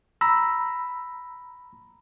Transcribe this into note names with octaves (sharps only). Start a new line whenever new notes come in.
A#5 B5 E6